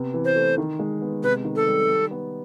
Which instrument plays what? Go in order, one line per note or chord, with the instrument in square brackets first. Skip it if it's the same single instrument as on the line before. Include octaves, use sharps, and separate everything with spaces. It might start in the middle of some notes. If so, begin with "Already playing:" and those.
Already playing: [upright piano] C3 B3
E3
[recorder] C5
[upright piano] A3
D#3
G#3
B3
[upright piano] C3 [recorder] B4
[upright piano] D#3
[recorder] A4
[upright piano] G3
G3
B3